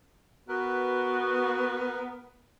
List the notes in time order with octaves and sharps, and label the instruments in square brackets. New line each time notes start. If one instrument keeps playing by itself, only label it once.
[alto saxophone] B3 [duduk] F#4 [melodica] A#4 B4